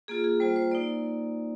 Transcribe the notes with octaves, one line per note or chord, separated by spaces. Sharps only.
A#3 F4 G#4
G#4
G3 A#3 F4 C5
C5
A#3 D#4 D5